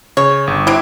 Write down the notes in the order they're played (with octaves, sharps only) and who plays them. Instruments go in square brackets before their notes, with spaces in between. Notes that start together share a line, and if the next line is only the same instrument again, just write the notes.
[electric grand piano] C#3 [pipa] C#5
[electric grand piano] G1
[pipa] C3 F#3 [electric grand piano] E4 D6